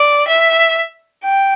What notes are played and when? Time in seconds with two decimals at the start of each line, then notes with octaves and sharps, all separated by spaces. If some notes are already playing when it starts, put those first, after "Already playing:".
Already playing: D5
0.28 E5
1.24 G5